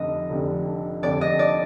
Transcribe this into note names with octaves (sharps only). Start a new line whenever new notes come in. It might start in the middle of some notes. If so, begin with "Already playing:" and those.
Already playing: F1 F2 D3 D#5
F1 F2 D3
F1 F2 D3 D5
D#5
D5